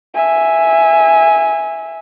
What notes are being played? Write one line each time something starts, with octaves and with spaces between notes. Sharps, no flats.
E5 G#5